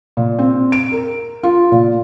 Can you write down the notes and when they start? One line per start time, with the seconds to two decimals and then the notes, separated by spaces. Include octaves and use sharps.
0.17 A#2
0.39 C4
0.72 D7
0.92 A#4
1.43 F4
1.72 A#2